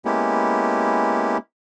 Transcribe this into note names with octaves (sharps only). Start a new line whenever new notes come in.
G#3 A#3 B3 C#4 E4 G4